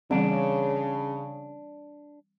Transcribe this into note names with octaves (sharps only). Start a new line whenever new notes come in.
C#3 E3 G3 C4 D4